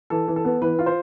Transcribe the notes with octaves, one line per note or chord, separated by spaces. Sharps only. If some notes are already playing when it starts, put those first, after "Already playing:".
E3 A4
E3
A4
B3
E3 B4
F4
C5